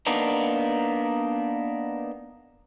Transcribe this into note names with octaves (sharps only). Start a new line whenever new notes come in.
A#3 B3 D4 D#4